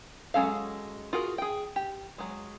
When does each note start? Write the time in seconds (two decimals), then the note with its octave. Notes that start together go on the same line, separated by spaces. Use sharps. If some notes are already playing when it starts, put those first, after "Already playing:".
0.34 F#3 G#3 C#4 A4 F5
1.13 F4 F#4 G#4 A#4
1.38 G#4 G5
1.76 G4
2.18 F#3 G#3